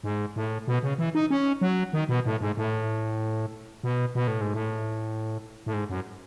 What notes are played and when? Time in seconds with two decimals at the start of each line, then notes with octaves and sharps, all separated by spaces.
0.04 G#2
0.36 A2
0.68 B2
0.83 C#3
0.98 E3
1.15 D#4
1.30 C#4
1.61 F#3
1.93 D#3
2.09 B2
2.26 A2
2.41 G#2
2.57 A2
3.83 B2
4.15 B2
4.27 A2
4.41 G#2
4.54 A2
5.66 A2
5.73 G#2
5.89 F#2